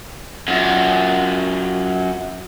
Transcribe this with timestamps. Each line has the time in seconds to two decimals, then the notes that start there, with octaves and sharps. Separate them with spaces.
0.48 F#2 F4